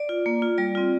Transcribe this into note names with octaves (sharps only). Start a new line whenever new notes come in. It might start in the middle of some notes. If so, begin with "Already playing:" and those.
Already playing: D5
F4
A#3
F4
G3 D5
C4 F4